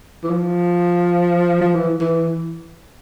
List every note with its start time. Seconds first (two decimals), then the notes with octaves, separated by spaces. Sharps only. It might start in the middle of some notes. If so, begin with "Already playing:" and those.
0.23 E3
0.30 F3
1.61 F3
1.74 E3
2.01 E3